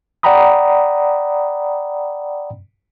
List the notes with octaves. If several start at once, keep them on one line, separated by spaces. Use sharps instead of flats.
D5 F#5 G5 A#5 B5 D#6